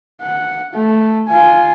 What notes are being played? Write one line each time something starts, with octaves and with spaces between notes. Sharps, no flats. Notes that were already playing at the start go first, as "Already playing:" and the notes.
F#5
A3
F4 G#5